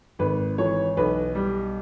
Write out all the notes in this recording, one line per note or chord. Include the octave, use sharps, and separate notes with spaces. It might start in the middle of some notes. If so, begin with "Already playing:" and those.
G#1 B4
E3 C#5
B1 B4
G3